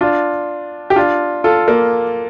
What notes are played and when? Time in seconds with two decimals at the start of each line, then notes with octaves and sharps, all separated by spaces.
0.01 D4 F4
0.90 G4
0.96 D4 F4
1.44 F4 A4
1.68 A#3